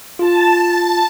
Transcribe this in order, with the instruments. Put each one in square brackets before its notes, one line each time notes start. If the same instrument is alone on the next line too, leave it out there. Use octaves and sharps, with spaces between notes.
[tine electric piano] F4 [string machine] A5